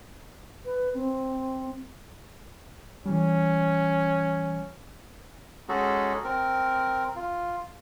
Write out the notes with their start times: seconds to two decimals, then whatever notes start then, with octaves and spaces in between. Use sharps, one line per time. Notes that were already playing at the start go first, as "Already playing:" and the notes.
0.65 B4
0.94 C4
3.06 E3 G3 C#4
5.69 G#3 C#4 D#4 F#4 G#4 A4
6.24 C4 A#4
7.16 F4